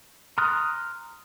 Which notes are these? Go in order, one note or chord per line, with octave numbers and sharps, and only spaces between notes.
A#5 C6 D#6 F6 F#6